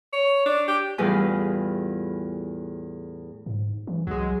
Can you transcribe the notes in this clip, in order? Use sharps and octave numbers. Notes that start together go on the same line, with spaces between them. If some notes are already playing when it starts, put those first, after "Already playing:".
C#5
D4
G4
E2 A2 G3 F4 G#4 B4
G#2
E3
C2 F#3 G#3